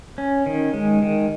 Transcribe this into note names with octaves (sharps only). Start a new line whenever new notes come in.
C#4
D#3
G#3
D#3